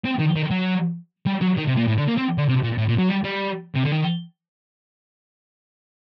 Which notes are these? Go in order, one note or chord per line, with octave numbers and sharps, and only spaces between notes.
C4
D#3
D#3
F#3
G3
F#3
D#3
C3
A#2
A2
D3
A#3
C4
D3
C3
A#2
A2
A#2
F#3
G3
G3
C3
D3
D#3